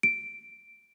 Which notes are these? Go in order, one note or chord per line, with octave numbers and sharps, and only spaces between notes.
D7